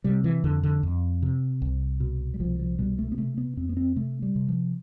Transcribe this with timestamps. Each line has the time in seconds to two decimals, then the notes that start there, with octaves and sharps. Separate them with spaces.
0.04 C3 G3
0.24 E3
0.44 F2 D3
0.63 D3
0.83 F2
1.22 C3
1.62 C2
2.00 B2
2.34 G3
2.40 C2 F3
2.59 F3
2.79 B2 G3
2.99 A3
3.12 B3
3.18 C3 A3
3.38 B3
3.57 F2 C4
3.69 B3
3.77 C4
3.96 C3 A3
4.22 G3
4.36 C3
4.48 F3